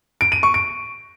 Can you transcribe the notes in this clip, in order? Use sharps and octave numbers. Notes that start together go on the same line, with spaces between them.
D7
D#7
C#6
D7